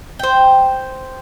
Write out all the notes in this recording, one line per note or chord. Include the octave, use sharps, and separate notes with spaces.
C5 G5